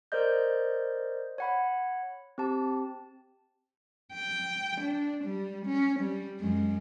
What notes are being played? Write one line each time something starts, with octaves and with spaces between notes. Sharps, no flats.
A#4 C5 D5 D#5 G6
C#5 F#5 B5
C4 G4 A5
G5
D4
G3
C#4
G3
F#2 G#3